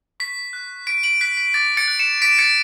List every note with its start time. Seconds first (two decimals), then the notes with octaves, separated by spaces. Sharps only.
0.20 C#6 B6
0.53 F#6
0.87 C#6 B6 D7
1.03 D7 F#7
1.21 F#6 B6
1.37 B6
1.54 D6 A6
1.77 A6 C#7
1.88 F#6
1.99 C#7 E7
2.22 D6 B6 D7
2.38 A6 C#7